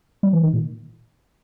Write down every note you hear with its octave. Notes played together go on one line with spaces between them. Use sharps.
G3
E3
D#3
A#2